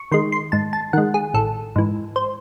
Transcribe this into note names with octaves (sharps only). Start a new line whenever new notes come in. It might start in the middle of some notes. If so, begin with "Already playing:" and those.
Already playing: C#6
D#3 G#3 C6
C6
G#2 A5
A5
D#3 G#3 F#5
G#4
A1 A4
G#2 E3
C5